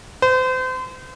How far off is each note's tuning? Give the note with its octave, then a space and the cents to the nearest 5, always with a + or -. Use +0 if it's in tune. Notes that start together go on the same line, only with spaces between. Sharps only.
C5 -35